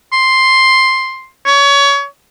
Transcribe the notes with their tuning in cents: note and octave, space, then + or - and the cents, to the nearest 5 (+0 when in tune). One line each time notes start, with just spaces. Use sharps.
C6 +5
C#5 +25